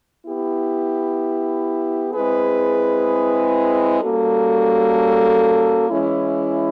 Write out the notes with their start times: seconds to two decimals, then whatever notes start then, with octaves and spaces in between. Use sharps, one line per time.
0.24 B3 E4 G4
2.13 G#3 C4 E4 G#4 B4
4.02 G3 A#3 C#4 F#4 A4
5.90 E3 G#3 C#4 E4